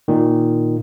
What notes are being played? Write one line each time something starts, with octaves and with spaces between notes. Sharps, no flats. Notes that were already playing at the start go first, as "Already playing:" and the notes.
A#2 D#3